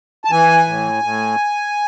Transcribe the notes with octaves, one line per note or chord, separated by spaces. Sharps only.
A5
E3 G#5
A2
A2